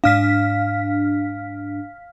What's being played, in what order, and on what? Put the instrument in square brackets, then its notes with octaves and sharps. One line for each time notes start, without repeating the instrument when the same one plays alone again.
[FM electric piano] G#2 D4 [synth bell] F5 F6 B6